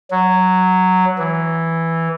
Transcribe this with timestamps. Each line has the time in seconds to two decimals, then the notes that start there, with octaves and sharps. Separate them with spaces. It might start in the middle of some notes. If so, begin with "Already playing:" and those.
0.11 F#3
1.18 E3